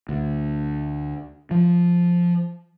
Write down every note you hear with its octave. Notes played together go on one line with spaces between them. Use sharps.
D2
F3